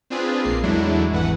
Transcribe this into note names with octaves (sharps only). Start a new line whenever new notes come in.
C4 D4 F4 G#4 B4
A#1 A#3 C7
E2 F#3 G#3 A3 D4 E4
G#1 E3 B4 F#5